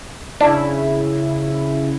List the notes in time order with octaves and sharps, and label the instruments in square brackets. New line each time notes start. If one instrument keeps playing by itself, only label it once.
[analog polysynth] C#3 E4 [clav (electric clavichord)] D4